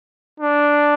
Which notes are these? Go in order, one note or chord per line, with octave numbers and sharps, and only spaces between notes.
D4